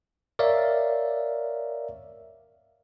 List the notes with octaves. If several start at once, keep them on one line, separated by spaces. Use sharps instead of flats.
A#4 C#5 D5 E5 F5